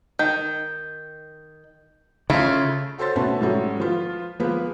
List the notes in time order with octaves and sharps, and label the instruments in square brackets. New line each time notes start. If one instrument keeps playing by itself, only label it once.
[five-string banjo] D#3 [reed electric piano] G6
[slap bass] C#3 [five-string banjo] A3 E4 F4
[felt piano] F#4 A4 C5 C#5 C6 A6
B2 A3 C#4 F#4 B4 A5
G#2 F#3 G3 A3 C#4 F#4
F3 F4 B4
F3 G#3 A#3 B3 G#4 B4